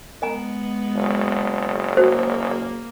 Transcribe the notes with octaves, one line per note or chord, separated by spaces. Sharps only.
G#3 B3 D#5 G#5 A#5
F#1
A#3 F#4 C5 A5